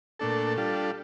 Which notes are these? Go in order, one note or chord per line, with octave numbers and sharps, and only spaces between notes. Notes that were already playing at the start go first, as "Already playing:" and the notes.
A#2 A3 D4 A4
G3 D4 F4 A4